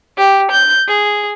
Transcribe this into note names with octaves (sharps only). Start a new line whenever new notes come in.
G4
G6
G#4